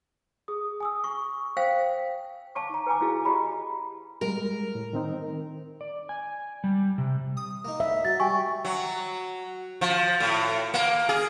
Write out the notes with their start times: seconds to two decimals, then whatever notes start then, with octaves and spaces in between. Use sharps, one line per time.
0.48 G#4 D#6
0.80 G#5 D#6 E6
1.04 C#6
1.57 C5 F5 G5
2.55 F5 A5 C#6 D6
2.69 D#4 A#5
2.86 B4 G5 G#5 A#5 D6
3.01 E4 F#4 G#4 F5
3.25 G4 D#5 F5 A#5 B5
4.21 G3 G#3 A#4
4.75 A2
4.93 D#3 C4 D#4
5.81 D5
6.09 G#5
6.64 G3
6.98 C3
7.37 D#6
7.65 A#3 D#4
7.80 E5
8.05 F#3 A6
8.20 G3 G5 G#5 C#6
8.65 F#3
9.81 F3
10.20 A2
10.74 A#3
11.09 G#4